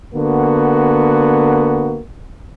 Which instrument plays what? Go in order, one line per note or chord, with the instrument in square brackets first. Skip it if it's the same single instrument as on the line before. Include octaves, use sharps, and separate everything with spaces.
[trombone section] D3 A#3 B3 F#4